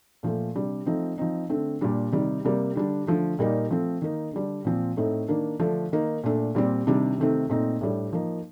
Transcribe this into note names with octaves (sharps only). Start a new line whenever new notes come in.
A#2 F3 A3
C3 G3 D4
F3 A3 C4 D#4
F3 C4 D#4
D3 A3 C4
A#2 G3 D4
C3 D#3 G3
C3 G3 A#3
D3 G3 D4
D3 F3 A3
A#2 G3 A#3 D#4
F3 A3 C4
D#3 A#3 D#4
D3 G3 D4
A#2 F3 C4
A2 A3 C4 D#4
D#3 A#3 D4
D3 F3 A3 D4
D#3 A#3 D#4
A#2 A3 D4
A#2 G3 C4
C3 D#3 G3 D4
C3 D#3 A3 C4
A#2 A3 C4 D#4
A2 G3 D4
F3 A#3 D#4